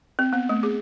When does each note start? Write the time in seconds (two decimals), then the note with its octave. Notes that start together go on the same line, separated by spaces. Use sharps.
0.19 C4
0.33 B3
0.49 A3
0.63 G#4